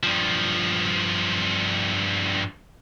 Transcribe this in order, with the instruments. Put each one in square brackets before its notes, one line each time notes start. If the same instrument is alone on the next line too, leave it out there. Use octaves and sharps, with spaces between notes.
[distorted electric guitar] G2 F3